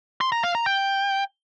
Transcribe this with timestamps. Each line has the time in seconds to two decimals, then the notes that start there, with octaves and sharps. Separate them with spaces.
0.21 C6
0.32 A#5
0.43 F5
0.55 A#5
0.66 G5